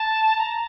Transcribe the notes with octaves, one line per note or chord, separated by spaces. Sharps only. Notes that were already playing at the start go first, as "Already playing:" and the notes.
Already playing: A5
A#5